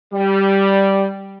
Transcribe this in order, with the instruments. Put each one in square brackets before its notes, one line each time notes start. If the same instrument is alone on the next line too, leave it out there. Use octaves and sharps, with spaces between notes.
[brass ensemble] G3